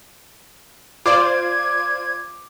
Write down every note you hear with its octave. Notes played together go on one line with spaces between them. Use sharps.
F4 C5 D5 D6 G#6